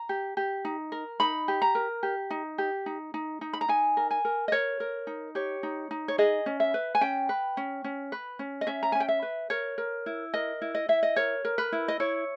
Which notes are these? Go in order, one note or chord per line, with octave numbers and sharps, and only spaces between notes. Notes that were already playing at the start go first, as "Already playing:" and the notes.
Already playing: A#5
G4
G4
D#4
A#4
D#4 B5
G4
A#5
A#4
G4
D#4
G4
D#4
D#4
D#4
B5
A#5
D#4 G#5
A#4
G#5
A#4
D#5
A#4 C#5
A#4
D#4
G4 C#5
D#4
D#4
C#5
G#4 D#5
C#4
E5
B4
G#5
C#4 G5
B4
C#4
C#4
B4
C#4
D#5
C#4 E5
A#5
C#4 G#5
G5
E5
B4
A#4 C#5
A#4
E4
A#4 D#5
E4
D#5
E4 E5
D#5
A#4 C#5
A#4
B4
E4
D#5
E4 C#5